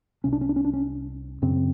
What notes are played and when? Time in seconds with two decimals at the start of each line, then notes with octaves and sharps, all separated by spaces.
0.24 C2 C3 C#4
0.33 D4
0.41 C#4
0.49 D4
0.56 C#4
0.65 D4
0.73 C#4
1.42 F#2 C#3 C4